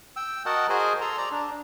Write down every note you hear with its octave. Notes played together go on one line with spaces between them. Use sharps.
G5 E6
F#4 A#4 D#5 F#5 A5
F#4 G#4 A#4 C5 D#5 G#5
A4 A#5 C6
D5 A#5
D4